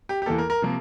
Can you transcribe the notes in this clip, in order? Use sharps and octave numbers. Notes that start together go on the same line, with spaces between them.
G4
G4
E2 E3 A#3 A4
A#4
A#4
C3 F3 A#3